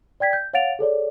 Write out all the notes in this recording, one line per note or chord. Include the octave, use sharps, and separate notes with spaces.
D5 G5 G#6 B6
G6
C#5 F5 F#5 A6 D7 F7
G#4 A4 C#5 D5